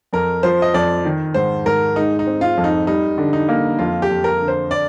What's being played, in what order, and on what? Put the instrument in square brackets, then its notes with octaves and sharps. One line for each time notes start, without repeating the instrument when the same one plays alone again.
[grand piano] F2 [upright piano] A#4
[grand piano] F3 [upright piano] C5
[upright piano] D#5
[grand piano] F2 [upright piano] D5
[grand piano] D#3
[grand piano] G#2 [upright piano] C5
[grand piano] G#2 [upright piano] A#4
[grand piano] G#3 [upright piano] D#4
[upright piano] D#4
[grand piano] C4
[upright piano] F4
[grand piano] F2
[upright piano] D#4
[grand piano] G3 [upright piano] D#4
[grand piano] D3
[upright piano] D#4
[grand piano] A#3
[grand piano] F2 [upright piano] F4
[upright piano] G4
[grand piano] F2
[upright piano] A#4
[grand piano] D3
[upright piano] C5
D5